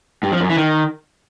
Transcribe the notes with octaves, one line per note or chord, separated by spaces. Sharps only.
G2
F3
F#2
E3
D#3